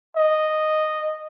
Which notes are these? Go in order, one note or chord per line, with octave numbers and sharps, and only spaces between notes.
D#5